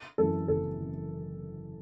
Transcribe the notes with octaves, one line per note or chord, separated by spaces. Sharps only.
F#2 E3 A4
F#1 A4
E3